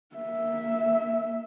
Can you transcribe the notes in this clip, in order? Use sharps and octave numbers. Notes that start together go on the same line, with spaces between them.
A#3 E5